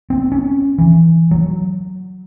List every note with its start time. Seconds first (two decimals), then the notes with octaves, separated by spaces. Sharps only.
0.10 C4
0.32 C#4
0.78 E3
1.31 F#3